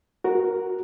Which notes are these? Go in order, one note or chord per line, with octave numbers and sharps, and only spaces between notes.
F#4 A#4